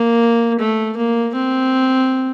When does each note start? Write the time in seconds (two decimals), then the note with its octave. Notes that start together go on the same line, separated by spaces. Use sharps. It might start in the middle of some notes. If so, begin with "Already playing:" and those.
Already playing: A#3
0.59 A3
0.97 A#3
1.35 C4